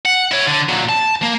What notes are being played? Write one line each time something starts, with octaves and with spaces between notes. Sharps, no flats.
F#5
E4 C#5
D3
A#2 F#3
A5
A#3